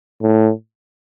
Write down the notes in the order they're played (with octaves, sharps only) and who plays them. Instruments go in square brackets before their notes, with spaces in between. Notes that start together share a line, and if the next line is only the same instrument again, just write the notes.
[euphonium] A2